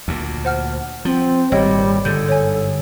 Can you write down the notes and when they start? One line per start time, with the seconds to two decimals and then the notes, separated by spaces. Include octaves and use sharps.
0.08 D2 A#2
0.45 C5 F#5 F6
1.05 F3 C4
1.52 G#1 A#2 G3 C#5 D#5 G5
2.05 G1 G#2 D3 A4 G6
2.28 C#5 G#5